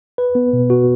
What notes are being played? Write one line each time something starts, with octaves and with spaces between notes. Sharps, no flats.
B4
B3
B2
F#4